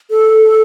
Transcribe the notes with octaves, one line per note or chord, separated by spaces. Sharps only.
A4